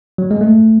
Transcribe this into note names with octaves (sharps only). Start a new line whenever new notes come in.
F#3
G#3
A3